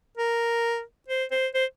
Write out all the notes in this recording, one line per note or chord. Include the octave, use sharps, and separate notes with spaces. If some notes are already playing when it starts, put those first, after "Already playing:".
A#4
C5
C5
C5